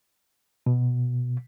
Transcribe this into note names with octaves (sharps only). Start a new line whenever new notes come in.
B2